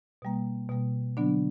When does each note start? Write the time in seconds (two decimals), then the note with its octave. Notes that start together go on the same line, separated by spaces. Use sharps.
0.22 B2 G3 A#3
0.69 B2 G3 A#3
1.17 D3 F#3 B3 D4